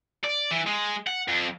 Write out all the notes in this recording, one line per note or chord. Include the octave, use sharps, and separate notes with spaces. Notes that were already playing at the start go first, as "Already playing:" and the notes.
D5
E3
G#3
F#5
F2